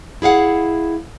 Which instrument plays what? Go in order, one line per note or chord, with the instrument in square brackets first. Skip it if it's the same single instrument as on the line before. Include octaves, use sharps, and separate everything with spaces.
[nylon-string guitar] E4 G#4 F5 F#5